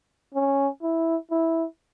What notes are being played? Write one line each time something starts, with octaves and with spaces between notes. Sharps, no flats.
C#4
E4
E4